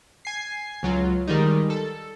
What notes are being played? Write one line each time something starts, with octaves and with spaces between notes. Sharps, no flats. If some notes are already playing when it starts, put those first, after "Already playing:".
G#5 C7
C#2 F#3 F4
D#3 G3 G#3 D#4
A4